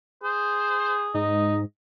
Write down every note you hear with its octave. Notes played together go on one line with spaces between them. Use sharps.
G#4 C5
G#2 D#4 D#5